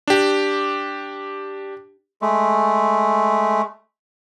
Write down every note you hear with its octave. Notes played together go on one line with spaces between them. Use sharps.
D4 G4
G#3 A3